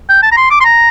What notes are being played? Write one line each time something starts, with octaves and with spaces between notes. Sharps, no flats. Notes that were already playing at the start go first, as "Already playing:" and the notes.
G5
A5
A#5
C6
D6
C6
A#5